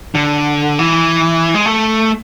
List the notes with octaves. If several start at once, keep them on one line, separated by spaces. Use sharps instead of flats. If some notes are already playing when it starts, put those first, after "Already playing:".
D3
E3
G#3
A3